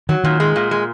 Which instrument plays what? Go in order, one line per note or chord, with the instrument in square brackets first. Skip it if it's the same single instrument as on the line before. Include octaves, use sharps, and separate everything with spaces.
[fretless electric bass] D#3 [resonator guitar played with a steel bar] F#3
[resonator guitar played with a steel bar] A#2 [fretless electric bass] D#3
[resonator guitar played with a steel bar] G#3
A#2
G#3